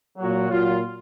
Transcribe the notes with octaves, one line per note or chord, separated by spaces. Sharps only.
A#2 F#3 F#4
A#2 F#3 F4